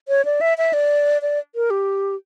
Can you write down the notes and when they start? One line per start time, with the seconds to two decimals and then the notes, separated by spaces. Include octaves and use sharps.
0.08 C#5
0.25 D5
0.41 E5
0.58 E5
0.73 D5
1.22 D5
1.55 A#4
1.70 G4